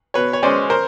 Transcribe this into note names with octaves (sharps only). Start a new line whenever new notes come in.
B2 B4 C#5
C#5
G#3 C#4 C5 D5
A#4 C5